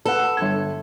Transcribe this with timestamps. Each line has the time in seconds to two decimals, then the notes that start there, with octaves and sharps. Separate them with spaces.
0.05 A4 B4 F#5
0.37 G1 G#6